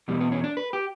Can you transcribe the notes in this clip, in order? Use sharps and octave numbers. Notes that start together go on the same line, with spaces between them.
E2 B2 G3
B3
C#4
D4
B4
G4